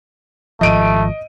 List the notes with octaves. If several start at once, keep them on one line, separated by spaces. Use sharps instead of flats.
G#1 F3 A3 D#5 D7 D#7